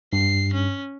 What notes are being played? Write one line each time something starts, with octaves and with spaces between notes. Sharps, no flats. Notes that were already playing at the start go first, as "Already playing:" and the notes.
G2 C7
C#4